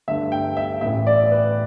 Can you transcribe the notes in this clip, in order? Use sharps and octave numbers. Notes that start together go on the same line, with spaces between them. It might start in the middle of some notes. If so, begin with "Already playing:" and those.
G2 D3 A3 E5
G5
E5
A1 A2 E3 E5
D5
B4